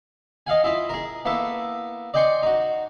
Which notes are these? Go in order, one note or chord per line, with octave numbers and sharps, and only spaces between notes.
D#5 F5 F#5 G#5
E4 F4 D#5 E5
G#4 A#4
A#3 B3 E4 A4
D5 D#5 G5 G#5 C6 C#6
D#4 F#4